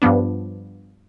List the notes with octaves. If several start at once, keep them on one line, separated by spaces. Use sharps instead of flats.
G2 F3 B3 D4